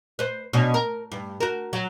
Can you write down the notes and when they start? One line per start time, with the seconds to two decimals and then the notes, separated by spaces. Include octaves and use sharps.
0.19 B4 C5
0.53 B2 C#4 D4
0.74 A#4
1.12 G2
1.40 F#4 A#4
1.73 F#3